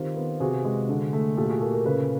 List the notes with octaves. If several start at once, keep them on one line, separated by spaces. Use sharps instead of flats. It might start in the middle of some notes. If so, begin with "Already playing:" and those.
Already playing: D#3 C4 F4 G4
B3
C3 F#4 G#4
G#3
D3
A3
A#2 G4 A4
F#4 G#4
A#3 G4 A4
G#4 A#4
C#3 A4 B4